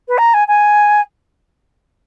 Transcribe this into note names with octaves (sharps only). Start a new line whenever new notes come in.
B4
A#5
G#5
G#5